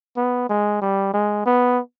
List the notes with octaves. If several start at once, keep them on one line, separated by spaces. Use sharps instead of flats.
B3
G#3
G3
G#3
B3